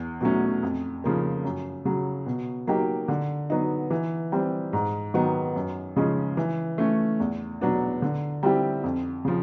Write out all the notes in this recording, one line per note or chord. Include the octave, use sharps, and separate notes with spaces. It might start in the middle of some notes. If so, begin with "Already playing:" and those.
Already playing: E2
B2 F#3 A3 C#4
F2
C#3 F3 A#3
F#2
C#3 F#3
B2
F#3 A#3 D#4 G4
D3
F#3 B3 D#4
E3
G3 C4
G#2
D#3 F#3 B3
F#2
C#3 F3 G#3 C#4
E3
A3 C#4
E2
B2 F#3 B3 D4
D3
G3 C4 E4 G4
F2
C#3 F3